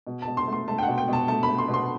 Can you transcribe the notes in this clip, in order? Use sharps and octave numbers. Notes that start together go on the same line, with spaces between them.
B2
B2 A5
C6
A3
C6
A3 A5
G5
B2 F#5
G5
B2 A5
A3 A5
B5
A3
C6
B2
C6